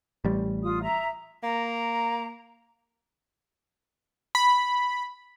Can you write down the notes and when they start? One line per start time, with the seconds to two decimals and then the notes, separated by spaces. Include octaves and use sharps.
0.25 A1 G3
0.64 F4 D#6
0.82 E5 A#5
1.43 A#3 A#5
4.35 B5